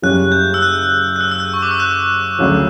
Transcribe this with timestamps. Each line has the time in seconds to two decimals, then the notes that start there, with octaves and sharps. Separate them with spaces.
0.02 F#1 F#2 C#3 G3 C#4 F#6
0.32 G6
0.54 E6
0.62 F#6
1.16 F#6
1.21 E6
1.31 E6
1.40 F#6
1.53 C#6
1.62 D6
1.71 E6
1.80 F#6
2.39 D2 C#3 F#3